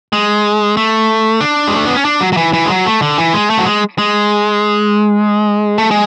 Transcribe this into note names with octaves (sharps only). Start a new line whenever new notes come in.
G#3
A3
D4
G#3
A3
B3
C#4
D4
F#3
F#3
E3
E3
G#3
F#3
A3
D3
E3
G#3
A3
F#3
G#3
G#3
A3
G#3